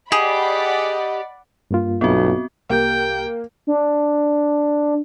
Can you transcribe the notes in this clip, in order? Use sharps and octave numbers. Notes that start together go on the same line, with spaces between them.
G4 G#4 D5 D#5 F#5 B5
G2 A#3 F4
B1 B3 C4 F#4
C2 A#3 G4 G5 G6
D4